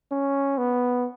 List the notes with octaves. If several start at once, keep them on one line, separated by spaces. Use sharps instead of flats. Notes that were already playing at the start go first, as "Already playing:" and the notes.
C#4
B3